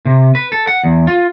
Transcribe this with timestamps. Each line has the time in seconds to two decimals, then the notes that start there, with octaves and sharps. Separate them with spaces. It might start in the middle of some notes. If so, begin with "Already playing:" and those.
0.05 C3
0.35 B4
0.52 A4
0.67 F#5
0.84 E2
1.07 F4